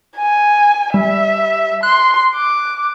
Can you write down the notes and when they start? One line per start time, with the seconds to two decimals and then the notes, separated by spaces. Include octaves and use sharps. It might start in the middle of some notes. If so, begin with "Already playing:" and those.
0.18 G#5
0.94 G3 E5
1.83 C6 F#6
2.35 D6